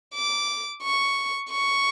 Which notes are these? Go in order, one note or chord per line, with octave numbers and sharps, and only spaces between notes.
D6
C#6
C#6